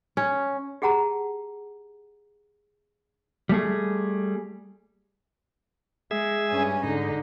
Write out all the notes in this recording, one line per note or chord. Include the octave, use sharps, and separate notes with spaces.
C#4
G4 G#4 F#5 A5 A#5
G3 A3 G#4
G#3 G#4 E5
G2 C#4 G#5
G#2 D3 D#4